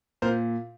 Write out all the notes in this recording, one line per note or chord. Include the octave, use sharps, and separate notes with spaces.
A#2 A#4 C5